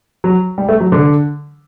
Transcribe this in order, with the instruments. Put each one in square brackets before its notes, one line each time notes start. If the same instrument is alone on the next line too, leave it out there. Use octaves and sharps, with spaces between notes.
[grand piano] F#3
G3
A3
F#3
D3